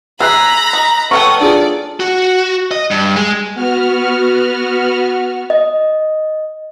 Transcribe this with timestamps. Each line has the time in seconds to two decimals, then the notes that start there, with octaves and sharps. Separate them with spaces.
0.20 G#4 A#5 B5 E6 F#6 C7
0.73 D#4
1.11 F#3 B3 A4 G5 C#6 D#6 F6
1.40 D4 F4 G#4 D5
2.00 F#4
2.71 D#5
2.91 G2
3.16 G#3
3.55 B3 F#4 F6
5.50 D#5